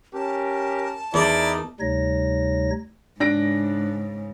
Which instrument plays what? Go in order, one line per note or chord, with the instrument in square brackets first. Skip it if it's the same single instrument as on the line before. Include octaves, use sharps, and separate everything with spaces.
[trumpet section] C#4 G4 A#4 [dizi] A5
[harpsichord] E2 [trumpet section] D#4 E4 A#4 [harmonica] D5
[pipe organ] D2 C3 G3 D#4 C#5 A#6
[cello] G#2 C#3 [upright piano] D4 A#6 D7